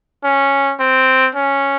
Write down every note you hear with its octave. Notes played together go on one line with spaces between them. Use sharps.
C#4
C4
C#4